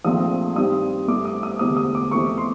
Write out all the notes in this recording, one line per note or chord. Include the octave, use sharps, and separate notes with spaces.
A#1 G#2 F3 A3 C4 D#6
G2 D#3 G3 C4 D#6
G2 E3 A3 D6
D#6
D#6
E1 D2 C3 E3 D#6
D#6
D6
F2 C3 E3 A3 C4 C#6
C6